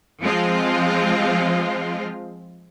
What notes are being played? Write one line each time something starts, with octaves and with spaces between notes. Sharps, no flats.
F3 G#3 C4 F4